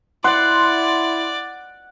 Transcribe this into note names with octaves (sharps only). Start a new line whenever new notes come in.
E4 D5 F#5 C6